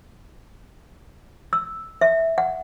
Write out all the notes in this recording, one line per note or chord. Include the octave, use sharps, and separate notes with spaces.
E6
E5
F#5